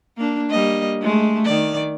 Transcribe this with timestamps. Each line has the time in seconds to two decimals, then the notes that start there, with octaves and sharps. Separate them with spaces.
0.18 A#3 D4
0.50 G3 A#3 D#5
1.02 G#3 A3
1.45 D#3 D5